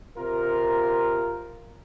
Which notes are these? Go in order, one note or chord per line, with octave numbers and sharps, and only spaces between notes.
C3 F4 A#4